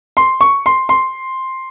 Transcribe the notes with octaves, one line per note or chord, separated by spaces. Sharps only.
C6
C#6
C6
C6